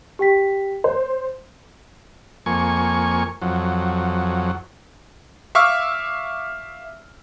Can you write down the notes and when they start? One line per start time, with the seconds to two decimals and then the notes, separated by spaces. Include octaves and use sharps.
0.19 G4 G5 B6
0.84 C5 C#5
2.46 F2 A#3 G#5 C#6
3.42 F2 F#3
5.55 E5 F5 C#6 D6 E6 F6